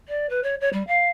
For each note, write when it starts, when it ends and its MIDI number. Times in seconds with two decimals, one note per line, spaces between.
0.08 0.26 74
0.29 0.40 71
0.43 0.55 73
0.61 0.69 73
0.73 0.83 55
0.87 1.09 77